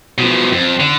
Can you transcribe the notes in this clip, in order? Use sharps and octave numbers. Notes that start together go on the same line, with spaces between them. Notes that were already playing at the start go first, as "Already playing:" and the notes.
B2 F3
F2
D3